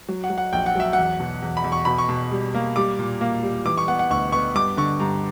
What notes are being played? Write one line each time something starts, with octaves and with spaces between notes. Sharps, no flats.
F#3
F#5
F#3
F#5
A#1 G5
F#5
F#3 E5
E2 F#5
B2
E2
B5
E2
C#6
B2 B5
C#6
B2
G3
A#3
G3 D6
A#2
A#3
G3
E3 D6
C#6
B3 F#5
F#5
D2 C#6
B3 C#6
G2 D6
D3 C#6
G2 A#5